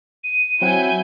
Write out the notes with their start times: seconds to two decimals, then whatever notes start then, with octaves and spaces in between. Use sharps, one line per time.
0.24 D#7
0.62 F#3 C4 E4 F#5 G#5 G6